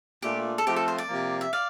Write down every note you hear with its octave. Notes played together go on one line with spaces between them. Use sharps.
A#2 A3 D4 F4 G4
A4
F3 A3 C4 F4 G4
A4
C5
D5
C3 F3 A#3
E5
D5 F5